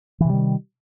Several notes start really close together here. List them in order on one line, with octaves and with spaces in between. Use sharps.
E3 C3 G3 D#3